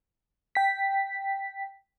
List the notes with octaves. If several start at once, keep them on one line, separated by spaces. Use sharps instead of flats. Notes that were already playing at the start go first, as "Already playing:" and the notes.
G5 B6